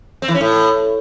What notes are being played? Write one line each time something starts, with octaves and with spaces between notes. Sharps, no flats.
C4
E3
C#4
A2